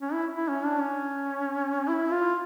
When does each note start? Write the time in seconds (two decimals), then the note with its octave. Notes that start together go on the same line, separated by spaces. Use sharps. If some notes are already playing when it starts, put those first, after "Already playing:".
0.02 C#4
0.13 E4
0.36 E4
0.49 C#4
0.64 D4
0.80 C#4
1.89 E4
2.11 F4